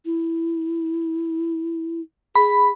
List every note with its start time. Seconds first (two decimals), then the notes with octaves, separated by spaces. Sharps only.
0.05 E4
2.35 G#4 B5